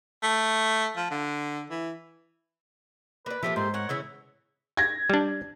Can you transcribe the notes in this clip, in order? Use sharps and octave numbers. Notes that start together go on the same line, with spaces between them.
A3
F3
D3
E3
A#3 B4 D5
F3 A#3 G4 A4 E5
G#2 C5
A#4 C#5 F#5
C#3 E3 C#4 E4
G#6 A#6
G3 D4